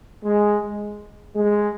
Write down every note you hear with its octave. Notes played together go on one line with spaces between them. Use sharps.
G#3
G#3